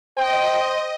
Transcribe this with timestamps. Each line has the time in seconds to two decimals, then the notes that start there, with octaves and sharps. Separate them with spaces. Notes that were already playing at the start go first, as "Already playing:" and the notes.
0.17 C5 D#5 G5